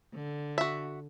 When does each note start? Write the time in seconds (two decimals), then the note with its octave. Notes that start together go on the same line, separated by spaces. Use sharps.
0.14 D3
0.58 F#4 E5